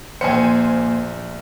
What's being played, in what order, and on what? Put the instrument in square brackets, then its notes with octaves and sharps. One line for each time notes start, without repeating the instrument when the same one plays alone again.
[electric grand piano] A#1 C#7 [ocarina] A#3 [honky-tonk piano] C5 G#5